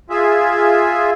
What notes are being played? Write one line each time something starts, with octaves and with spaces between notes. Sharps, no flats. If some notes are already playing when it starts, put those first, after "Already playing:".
F4 G#4 E5